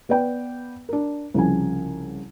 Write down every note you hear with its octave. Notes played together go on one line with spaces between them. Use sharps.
B3 B4 D5 G5
D4 A#4
C2 C#3 F3 G#5